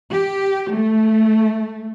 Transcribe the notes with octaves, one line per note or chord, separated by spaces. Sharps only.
G4
A3